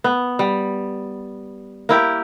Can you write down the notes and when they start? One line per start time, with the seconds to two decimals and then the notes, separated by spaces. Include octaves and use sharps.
0.04 B3
0.39 G3
1.89 A#3 E4 G4